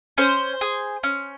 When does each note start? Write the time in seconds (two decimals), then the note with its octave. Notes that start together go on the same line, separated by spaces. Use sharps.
0.18 C#4 C5
0.61 G#4
1.04 C#4